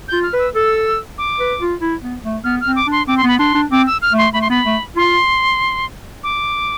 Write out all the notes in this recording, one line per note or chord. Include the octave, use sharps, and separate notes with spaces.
F4 G6
F6
B4
E6
A4 E6
D6
B4
F4
E4
B3
A3
B3 F6
F6
C4
D6
D4
C6
C4 D6
C6
B3 B5
D4 C6
D4
C4 D6
E6
F6
A3
C6
A3 B5
C6
B3 B5
A3
F4 C6
D6